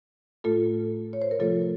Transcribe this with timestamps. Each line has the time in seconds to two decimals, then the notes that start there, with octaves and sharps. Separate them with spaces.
0.44 A2 A3 F4 A4
1.13 C#5
1.22 C5
1.31 A#4
1.39 C3 F3 A3 F4 A4